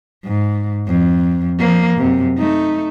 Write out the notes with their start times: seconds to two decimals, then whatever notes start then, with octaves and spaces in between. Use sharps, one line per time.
0.24 G#2
0.88 F2
1.59 F3 A#3
1.98 F#2 C3
2.38 A3 D#4